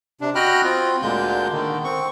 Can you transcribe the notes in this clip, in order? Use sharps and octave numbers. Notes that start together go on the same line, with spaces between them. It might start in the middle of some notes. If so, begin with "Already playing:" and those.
C3 D4
F#4 D#5 G5 B5 F6 F#6
C4 F4
D2 A#2 D3 G#3 A#3 G6
D3 D#3
C4 C#6